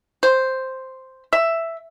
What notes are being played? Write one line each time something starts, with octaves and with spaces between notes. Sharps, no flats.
C5
E5